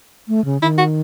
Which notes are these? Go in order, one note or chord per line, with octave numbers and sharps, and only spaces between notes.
A3
C#3
D#3 E4
F#4